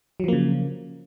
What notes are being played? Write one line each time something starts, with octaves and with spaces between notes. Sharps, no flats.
C#3 F3 F#3 A#3